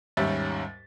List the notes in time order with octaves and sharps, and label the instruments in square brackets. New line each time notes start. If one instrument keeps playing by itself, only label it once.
[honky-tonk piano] D#2 G#2 G3 C#4 E5 A6